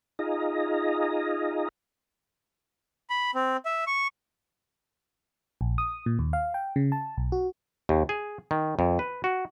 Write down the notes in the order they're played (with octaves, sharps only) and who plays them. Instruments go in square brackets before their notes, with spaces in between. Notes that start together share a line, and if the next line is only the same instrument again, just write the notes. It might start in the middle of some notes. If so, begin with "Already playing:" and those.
[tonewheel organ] D#4 F4 G#4 D#5 A#5
[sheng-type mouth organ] B5
C4
E5
C#6
[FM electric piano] A#1
D#6
A#2
D#2
F5
G5
C#3
A5
B1
F#4
[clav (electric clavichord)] D#2
G#4
D#3
F2
B4
F#4